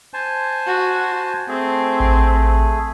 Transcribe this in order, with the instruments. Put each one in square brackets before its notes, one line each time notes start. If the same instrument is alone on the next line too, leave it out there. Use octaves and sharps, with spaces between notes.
[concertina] C5 G#5 A5
[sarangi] F#4
[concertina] A3 G#4 [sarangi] C4
[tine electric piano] A1